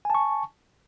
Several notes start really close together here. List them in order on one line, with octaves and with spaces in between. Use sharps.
G#5 A5 C#6